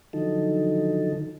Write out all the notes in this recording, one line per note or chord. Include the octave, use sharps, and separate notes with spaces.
D3 D#3 F3 F#3 D#4 A4